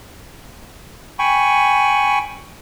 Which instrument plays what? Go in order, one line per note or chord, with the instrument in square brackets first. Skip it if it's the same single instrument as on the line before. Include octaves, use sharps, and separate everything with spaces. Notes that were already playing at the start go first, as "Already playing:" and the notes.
[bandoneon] G5 G#5 B5 C#6